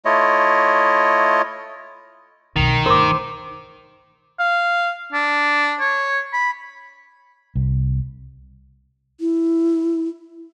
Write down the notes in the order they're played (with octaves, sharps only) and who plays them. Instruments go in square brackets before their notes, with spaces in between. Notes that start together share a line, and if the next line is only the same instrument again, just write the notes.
[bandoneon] A3 E4 F4 C#5 D#5
[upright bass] B1 F2 [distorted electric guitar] D#3
[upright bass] G1 D2 [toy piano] A#4 D6 [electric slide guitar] C5
[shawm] F5
D4
C#5
B5
[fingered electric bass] C2
[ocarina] E4